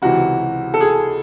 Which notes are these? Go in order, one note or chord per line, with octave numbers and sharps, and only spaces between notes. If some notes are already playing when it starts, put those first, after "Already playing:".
C#2 C3 E3 F#4
A4
G#4